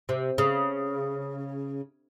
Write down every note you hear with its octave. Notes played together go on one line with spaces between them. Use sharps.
C3
C#3